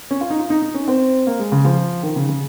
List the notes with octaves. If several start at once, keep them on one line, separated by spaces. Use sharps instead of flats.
C#4
F4
D#4
F4
D#4
D#4
C#4
C4
A#3
G#3
C#3
F3
D#3
C#3
C#3